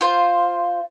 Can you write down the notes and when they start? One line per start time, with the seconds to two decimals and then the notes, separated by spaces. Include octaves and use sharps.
0.01 F4 C5 F5